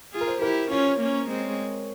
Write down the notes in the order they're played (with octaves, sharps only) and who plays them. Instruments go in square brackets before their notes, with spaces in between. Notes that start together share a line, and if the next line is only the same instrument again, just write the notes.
[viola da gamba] F4 G#4
[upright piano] A#4
C5
[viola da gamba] E4 G4 [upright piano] A#4
[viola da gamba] C#4 F4 [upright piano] C#5
[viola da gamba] A#3 C#4
G#3 C4